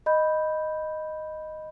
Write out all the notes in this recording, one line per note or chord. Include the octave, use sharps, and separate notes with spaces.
D#5 B5 G6